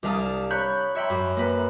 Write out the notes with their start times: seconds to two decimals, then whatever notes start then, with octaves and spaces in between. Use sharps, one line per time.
0.03 C2 D4 F5 A5 D#6
0.50 C#5 B5 F#6 G6
0.95 C#5 E5 G5 B5 C6
1.10 F#2
1.37 A#3 B4